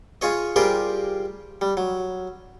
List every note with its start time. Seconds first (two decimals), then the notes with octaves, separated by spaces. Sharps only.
0.21 F4 G#4 C#5 D#5
0.56 G3 F4 G4 G#4 A#4 C5
1.61 G3
1.77 F#3